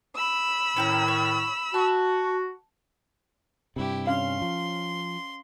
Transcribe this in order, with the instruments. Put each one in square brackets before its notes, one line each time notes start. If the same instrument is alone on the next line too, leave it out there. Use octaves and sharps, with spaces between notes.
[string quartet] B5 E6
[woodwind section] A2 D#3 [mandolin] C#4 G5 A#5
[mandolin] C#5
[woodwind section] F#4 [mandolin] A5
[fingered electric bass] G2 C3 [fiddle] E4 G4
[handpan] C#4 F5 [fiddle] C6
[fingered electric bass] F3